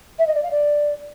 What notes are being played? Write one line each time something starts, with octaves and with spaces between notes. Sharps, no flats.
E5
D#5
D5
F5
D5